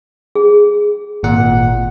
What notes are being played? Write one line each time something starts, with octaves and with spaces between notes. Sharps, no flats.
G#4
G#1 A#2 F#5